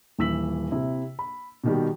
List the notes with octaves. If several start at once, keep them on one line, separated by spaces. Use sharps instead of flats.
D#1 E3 E6 B6 F#7
C3 E4
B5
B2 D#3 G3